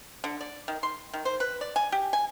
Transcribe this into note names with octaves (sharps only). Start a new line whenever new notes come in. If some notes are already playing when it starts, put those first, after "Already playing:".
D3
D5
D#3
C6
D#3
C5
B4
D5
G#5
G4
G#5